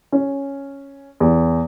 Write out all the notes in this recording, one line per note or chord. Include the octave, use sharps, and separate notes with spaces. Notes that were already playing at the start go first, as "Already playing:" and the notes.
C#4
E2